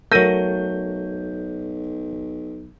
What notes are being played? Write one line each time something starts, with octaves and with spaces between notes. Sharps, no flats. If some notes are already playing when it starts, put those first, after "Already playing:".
B1 F#3 A3 A#4 G6 A#6 D#7